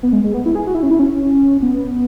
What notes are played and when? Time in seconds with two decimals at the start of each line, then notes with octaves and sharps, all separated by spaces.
0.03 B3
0.13 G#3
0.24 G#3
0.34 B3
0.46 E4
0.55 G#4
0.67 F#4
0.74 E4
0.83 C#4
0.91 E4
0.99 C#4
1.62 B3